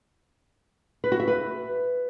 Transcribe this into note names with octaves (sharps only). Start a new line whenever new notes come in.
B4
F#4
E5
B4